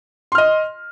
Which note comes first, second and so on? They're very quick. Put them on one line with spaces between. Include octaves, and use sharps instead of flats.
C6 F6 D#5